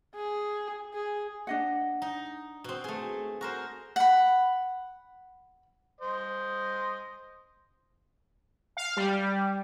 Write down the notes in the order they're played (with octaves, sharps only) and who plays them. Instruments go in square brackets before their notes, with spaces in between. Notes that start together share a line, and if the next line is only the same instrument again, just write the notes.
[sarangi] G#4
G#4
[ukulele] D4 D#5 F#5
[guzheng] D#4
B2 C4
A3 G#4
F#4 A#4 C5
[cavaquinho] F#5 B5
[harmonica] C5 D#5
[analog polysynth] F5
G3